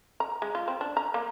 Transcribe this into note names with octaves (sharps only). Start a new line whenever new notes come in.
A#5
G#3
F4
C4
D4
A#5
A#3